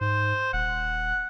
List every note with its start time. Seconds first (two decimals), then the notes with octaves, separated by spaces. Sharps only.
0.01 G#2 C5
0.53 D#1 F#5